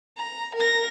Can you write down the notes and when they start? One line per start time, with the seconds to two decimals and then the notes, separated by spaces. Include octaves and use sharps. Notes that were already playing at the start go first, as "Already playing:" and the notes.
0.17 A#5
0.56 A#4 A#6